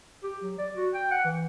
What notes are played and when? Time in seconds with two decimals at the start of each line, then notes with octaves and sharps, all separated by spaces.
0.24 G4
0.42 F#3
0.59 D5
0.76 F#4
0.94 G5
1.11 F#5
1.24 E3